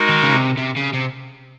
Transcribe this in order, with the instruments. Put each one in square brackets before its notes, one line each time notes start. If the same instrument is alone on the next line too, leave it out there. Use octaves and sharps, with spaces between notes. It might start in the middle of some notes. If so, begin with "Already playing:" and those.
Already playing: [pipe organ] G#3 D#4 F#4 A#4
[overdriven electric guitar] D#3
C#3
C3
C3
C#3
C3